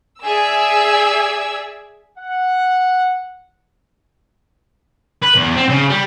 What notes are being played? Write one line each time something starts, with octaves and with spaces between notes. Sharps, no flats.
G#4 D5 E5 G#5 E6 G#6
F#5
B4
E2
C4
C#3
G3